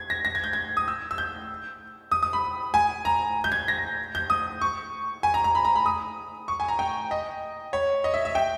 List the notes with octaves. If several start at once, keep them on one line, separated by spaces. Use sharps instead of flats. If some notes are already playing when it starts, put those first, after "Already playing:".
Already playing: G#6
A#6
A#6
G#6
G6
G#6
D#6
E6
E6
G6
D#6
D#6
B5
G#5
A#5
G6
G#6
A#6
G6
D#6
C#6
G#5
A#5
A#5
B5
A#5
B5
D#6
C#6
G#5
A#5
G5
D#5
C#5
D#5
E5
E5
G5